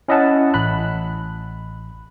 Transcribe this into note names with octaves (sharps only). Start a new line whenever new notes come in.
C#4 E4 D#5 E5 F#5 A5
A1 B5 F#6